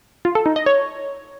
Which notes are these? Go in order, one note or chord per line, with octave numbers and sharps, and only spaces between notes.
F4
A4
D#4
D#5
C#5